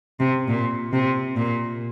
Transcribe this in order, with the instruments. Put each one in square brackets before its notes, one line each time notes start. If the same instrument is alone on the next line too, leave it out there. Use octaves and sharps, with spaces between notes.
[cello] C3
A#2
C3
A#2